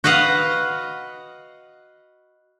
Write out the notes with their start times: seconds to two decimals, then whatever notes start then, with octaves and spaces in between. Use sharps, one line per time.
0.04 F#4 B4 D#5 F5 F#5